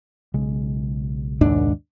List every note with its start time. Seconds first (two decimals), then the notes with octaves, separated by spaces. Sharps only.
0.34 B1 C#3 G#3
1.41 D#2 G#2 D4